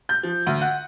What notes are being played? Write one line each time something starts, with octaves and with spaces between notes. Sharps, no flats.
G6
F3
D2
F#5